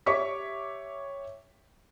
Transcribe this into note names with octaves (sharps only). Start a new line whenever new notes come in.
G4 C#5 E5 C#6 D6 B6